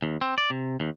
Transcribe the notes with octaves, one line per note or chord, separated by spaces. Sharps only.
D#2
C4
D5
C3
D#2